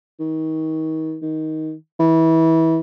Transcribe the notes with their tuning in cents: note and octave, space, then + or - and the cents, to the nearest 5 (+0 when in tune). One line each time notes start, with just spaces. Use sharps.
D#3 +30
D#3 +15
E3 -25